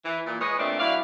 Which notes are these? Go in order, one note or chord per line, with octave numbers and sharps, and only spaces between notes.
E3
A#2
G#3 B4 C#5 D#5
A#2 A3 C4 D4
F#3 E4 D5 F5